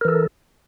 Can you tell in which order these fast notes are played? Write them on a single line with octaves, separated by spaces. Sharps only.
A#4 E3 A4